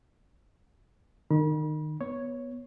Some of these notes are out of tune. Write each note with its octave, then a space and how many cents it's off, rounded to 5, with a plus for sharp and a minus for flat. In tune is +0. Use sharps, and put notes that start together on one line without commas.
D#3 -25 B5 -40
B3 -10 C#5 +0